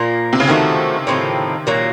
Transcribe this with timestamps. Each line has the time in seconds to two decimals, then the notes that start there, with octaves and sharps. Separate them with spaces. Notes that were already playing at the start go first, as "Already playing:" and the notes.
Already playing: A#2 F3 A#3
0.33 C3
0.40 C#3
0.48 C3 D#3 F3 A3 D#4 F#4
1.07 A2 F3 C4 D#4
1.67 A#2 F#3 A#3